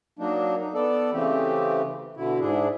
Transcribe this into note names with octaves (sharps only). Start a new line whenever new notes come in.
F#3 A#3 D4 D#4
D#4
B3 A4 D5
C#3 E3 A3 C4 G4
B2 D3 E4
G#2 D4 E4 G#4